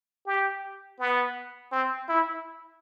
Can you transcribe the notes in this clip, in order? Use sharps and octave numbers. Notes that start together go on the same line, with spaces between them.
G4
B3
C4
E4